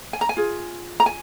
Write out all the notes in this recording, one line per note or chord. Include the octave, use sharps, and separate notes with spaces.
G#5
A#5
G#5
F4 G#4
A#5
G#5